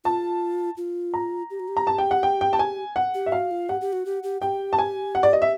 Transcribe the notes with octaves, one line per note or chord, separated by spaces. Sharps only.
F4 A5
F4
A#5
G4
F#4
G4
A#5
A5
G5
F#5
G5
G5
A5
G#5
F#5
G4
E5
F#4 F5
F4
G4 F#5
G4
F#4
G4
G4
G4 G5
A5
G#5
F#5
D5
D#5
E5